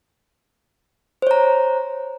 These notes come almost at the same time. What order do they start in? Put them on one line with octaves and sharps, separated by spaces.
C5 C#5 A#5